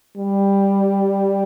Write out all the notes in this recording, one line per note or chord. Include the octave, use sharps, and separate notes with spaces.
G3